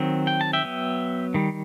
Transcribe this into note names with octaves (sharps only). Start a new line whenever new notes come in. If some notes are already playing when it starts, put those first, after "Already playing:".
Already playing: D#3 F#3 C4
G5
A5
E5 G5
F#3 B3
D#3 G3